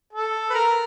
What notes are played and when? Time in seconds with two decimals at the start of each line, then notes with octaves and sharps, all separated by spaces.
0.13 A4
0.50 B4
0.54 A#4